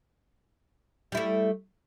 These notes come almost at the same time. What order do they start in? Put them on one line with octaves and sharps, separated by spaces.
G3 E4 A3